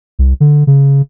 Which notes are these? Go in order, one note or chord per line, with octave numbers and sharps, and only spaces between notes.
C2
D3
C#3